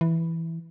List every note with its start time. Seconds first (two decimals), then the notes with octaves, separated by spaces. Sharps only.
0.01 E3